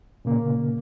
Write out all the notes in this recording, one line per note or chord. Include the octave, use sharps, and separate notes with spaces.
A#2 C#3 A#3